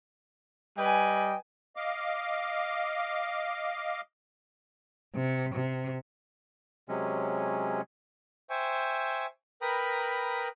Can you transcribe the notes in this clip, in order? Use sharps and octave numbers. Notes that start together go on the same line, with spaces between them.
G3 B4 D#5 G5 G#5
D#5 F5 D6
C3
C3
C3 F#3 G#3 C#4
C5 E5 G5 G#5 C#6
A#4 B4 G5 A#5 B5 D#6